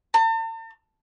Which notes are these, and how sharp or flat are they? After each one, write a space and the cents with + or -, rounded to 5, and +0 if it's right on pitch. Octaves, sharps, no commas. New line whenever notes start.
A5 +45